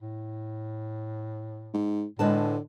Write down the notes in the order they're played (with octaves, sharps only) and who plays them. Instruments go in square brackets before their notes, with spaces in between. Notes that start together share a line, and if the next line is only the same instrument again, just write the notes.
[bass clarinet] A2
[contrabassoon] G#2
[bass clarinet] A2 [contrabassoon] D3 [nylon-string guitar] G#3 B4 A5